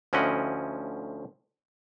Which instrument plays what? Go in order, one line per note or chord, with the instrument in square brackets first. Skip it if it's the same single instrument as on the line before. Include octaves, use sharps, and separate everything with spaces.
[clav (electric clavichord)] D2 F3 C#4 E4 D#5 F#5